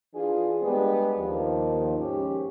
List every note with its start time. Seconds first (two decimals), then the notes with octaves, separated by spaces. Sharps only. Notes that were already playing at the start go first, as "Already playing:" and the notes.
0.13 E3 D4 F4 G#4
0.62 G3 G#3 B3 D4 G4
1.17 D#2 F3
1.97 G#2 C#4 G4